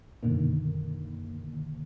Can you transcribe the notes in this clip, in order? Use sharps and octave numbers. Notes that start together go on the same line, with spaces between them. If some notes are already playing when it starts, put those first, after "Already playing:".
F#2 B2 D3 D#3 A#3